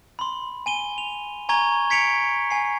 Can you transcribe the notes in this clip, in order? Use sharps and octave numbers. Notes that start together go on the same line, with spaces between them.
B5 C6
G#5 D#7 G7
F7
G#5 A#5 C#6 G#6 G7
G#6 B6 C#7 D7 F7
G#5 C7